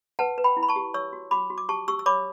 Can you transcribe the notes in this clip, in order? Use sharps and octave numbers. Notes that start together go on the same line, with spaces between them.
B4 F#5 A5
B4
G5 B5
E4
B5
A5 C#6
G4
C#5 C#6 E6
F#4
F#4 B5 D6
F#4
D6
G4 A5 C#6
G4 C#6 E6
E6
C#5 B5 D6